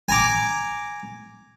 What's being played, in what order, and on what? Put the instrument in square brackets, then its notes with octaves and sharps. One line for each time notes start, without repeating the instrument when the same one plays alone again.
[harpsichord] G#5 A#5 D6